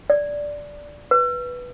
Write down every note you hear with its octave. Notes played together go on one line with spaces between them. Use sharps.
D5
B4